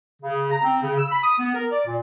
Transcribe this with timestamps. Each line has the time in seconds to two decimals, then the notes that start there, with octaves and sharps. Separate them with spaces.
0.23 C#3
0.51 A#5
0.63 C4
0.82 C#3
0.98 E6
1.11 B5
1.23 D#6
1.39 B3
1.54 A#4
1.71 D5
1.86 A#2